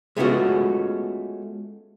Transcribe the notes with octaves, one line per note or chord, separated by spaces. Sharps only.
G#3 A3 B3 C#4 F4 F#4